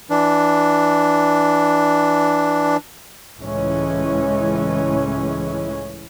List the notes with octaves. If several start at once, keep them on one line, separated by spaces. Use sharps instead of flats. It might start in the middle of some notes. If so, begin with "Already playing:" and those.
E3 D4
C#2 A2 E3 G#3 C#4